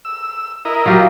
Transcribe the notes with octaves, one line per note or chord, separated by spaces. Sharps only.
E6
E4 A#4 D#5
F#3 F4 G4